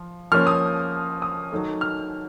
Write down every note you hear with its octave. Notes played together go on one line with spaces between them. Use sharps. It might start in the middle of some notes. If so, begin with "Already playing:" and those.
Already playing: F3
F3 A#3 C#4 F6
D#6
D#6
D#3 F#3 A3
F6